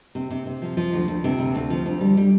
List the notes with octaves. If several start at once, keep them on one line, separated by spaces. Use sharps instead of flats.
C3
C3
C3
F3
F3
D2
D2
C3
D2
D2
F3
D2
G3
G3